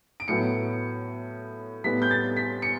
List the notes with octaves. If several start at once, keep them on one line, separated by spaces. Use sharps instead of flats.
D7
A2 F#3 B3 C#7
A2 G3 B3 B6
G6
A6
B6
C#7